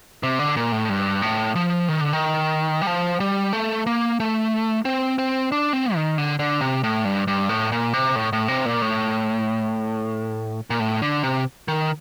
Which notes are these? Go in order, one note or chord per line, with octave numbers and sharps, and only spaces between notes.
C3
D3
A#2
A2
G2
A2
F3
D#3
D3
D#3
G3
F3
G3
A3
A#3
A3
C4
C4
D4
C4
D#3
D3
D3
C3
A2
G2
G2
A2
A#2
C3
A2
A2
C3
A#2
A2
A#2
A2
D3
C3
D#3